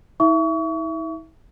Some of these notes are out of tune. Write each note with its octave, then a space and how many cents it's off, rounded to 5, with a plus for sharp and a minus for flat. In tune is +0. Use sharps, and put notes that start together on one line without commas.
E4 -45 E5 +20 C#6 +35